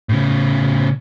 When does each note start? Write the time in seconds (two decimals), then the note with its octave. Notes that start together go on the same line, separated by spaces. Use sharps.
0.09 A2 C#3